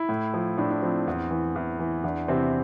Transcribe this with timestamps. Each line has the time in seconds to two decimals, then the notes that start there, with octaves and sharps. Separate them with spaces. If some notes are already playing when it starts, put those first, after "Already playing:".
Already playing: E4
0.09 A2
0.34 F3
0.58 A2 D4
0.70 D4
0.82 F3 C4
1.07 E2
1.31 E3
1.56 E2
1.80 E3
2.04 E2 D4
2.28 C3 E3 C4